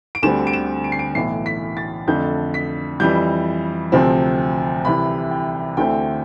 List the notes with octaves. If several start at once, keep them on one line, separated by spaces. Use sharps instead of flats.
D7
D2 D3 G3 C4 E7
D7
E7
D7
C7
D7
B1 A2 E3 C7
B6
A6
F2 D3 A3 G6
B6
F2 E3 G3 G6
D2 C3 F3 C4
C2 C3 E3 B5
G5
D2 D3 A3 C4 E4 G5